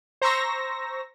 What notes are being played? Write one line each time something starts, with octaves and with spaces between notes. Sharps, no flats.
C5 A#5 C#6 E6 A#6